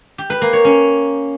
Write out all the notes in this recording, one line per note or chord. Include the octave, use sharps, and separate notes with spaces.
G4
B4
A#3
C#5
C#4